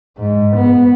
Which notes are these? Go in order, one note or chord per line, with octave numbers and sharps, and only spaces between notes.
G#2
B3